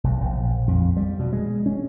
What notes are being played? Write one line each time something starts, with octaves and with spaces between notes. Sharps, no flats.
B1
A#1
F2
G3
B2
G#3
C#4